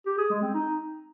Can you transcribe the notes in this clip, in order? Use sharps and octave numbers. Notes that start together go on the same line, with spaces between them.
G4
G#4
G#3
C4
D#4